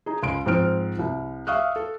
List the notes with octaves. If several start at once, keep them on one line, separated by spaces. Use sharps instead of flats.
D#4 G#4
C#2 C6 D7
G#2 F3 C4 F6 D7
C2
E5 F5 C#6 D#6 F6 F#6
A4